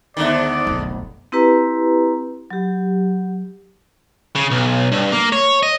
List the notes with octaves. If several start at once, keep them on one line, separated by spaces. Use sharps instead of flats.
D2 G#2 D3 D#3 B3 D5 E5
F1 B1
C4 E4 G4 B4 A#5
F#3 G4
C#3
B1
G2
A#3
C#5
D#5